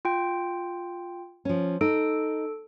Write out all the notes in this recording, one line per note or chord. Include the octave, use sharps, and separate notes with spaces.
F4 G5
F3 C#4
D#4 A4 D7